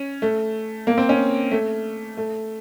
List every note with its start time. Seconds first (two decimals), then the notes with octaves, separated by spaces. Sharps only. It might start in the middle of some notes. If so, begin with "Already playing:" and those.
Already playing: C#4
0.22 A3
0.87 A#3
0.98 C4
1.09 C#4
1.52 A3
2.17 A3